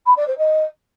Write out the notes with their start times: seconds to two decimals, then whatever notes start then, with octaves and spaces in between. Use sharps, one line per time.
0.06 B5
0.16 D5
0.27 C5
0.38 D#5